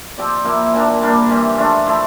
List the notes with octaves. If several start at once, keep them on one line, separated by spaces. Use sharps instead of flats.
F3 C4 G4 D5
C3 F3 A#3 E4
A#2 F3 A#3 D4
G3 A#3 D4
C3 E3 G3
A3 D4 F4
F3 A3 E4